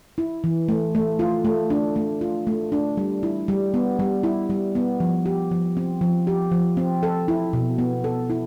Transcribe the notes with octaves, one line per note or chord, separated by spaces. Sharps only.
E4
E3
A3
A3
F4
A3
D4
A3
F4
A3
D4
G3
E4
G3
B3
G3
E4
G3
B3
F3
G4
F3
C4
F3
G4
F3
C4
A4
E4
B2
B3
A4
E4